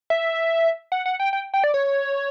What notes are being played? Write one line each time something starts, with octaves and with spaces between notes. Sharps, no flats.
E5
F#5
F#5
G5
G5
G5
D5
C#5